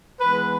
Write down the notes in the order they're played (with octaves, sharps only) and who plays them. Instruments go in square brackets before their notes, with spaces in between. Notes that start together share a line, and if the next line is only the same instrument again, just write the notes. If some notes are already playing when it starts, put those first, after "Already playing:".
[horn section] E3 G#3 B3 B4